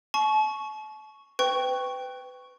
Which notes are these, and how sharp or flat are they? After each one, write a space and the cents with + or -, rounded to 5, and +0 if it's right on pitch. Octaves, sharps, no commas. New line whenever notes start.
A5 -40 C#6 +0
B4 +30 G5 +0 C#6 +0